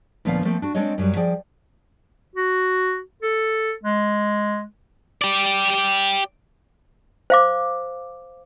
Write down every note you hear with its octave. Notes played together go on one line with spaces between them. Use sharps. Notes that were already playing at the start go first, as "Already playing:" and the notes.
D2 A#2 F3 B3 C#4 F5
F3 A3 A#3 C4
D4 F#4
G#3 C4 D4 A4 C#5 D#5
F#2 F#3 G3
F3 G#4 D5 G5
F#4
A4
G#3
G4 D5
C5 F5 D6